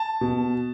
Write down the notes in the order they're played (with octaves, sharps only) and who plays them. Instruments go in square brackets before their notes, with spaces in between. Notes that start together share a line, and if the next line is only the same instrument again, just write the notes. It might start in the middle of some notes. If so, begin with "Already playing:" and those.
Already playing: [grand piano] A5
B2